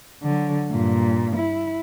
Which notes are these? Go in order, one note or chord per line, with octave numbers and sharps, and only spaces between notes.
D3 F#3
G2 A#2
E4